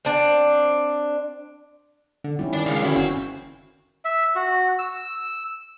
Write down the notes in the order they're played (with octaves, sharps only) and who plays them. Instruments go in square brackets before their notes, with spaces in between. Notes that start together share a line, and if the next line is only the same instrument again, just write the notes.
[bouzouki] C4 D4
[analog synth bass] D3
[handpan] D#3 C#4 E4 [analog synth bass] G3
[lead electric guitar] D4 D5
[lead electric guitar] C#2 [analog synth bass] C#3 [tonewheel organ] F5
[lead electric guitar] A#2 E4 [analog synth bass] D3 [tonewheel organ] C#4 [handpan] F#4
[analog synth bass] F#1 [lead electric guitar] C4
[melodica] E5
F#4
E6